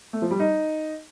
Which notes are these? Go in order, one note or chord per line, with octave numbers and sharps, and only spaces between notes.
A3
F3
G3
D#4